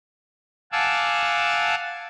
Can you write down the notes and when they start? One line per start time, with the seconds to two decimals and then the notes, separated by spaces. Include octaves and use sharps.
0.72 F5 F#5 G#5 A5 D6 E6